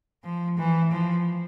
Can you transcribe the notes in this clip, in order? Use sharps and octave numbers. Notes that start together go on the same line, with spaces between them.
F3
E3
F3